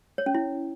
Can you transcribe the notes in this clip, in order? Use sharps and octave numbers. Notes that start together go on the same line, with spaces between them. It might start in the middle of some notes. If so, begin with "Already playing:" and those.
C#5
C#4
E4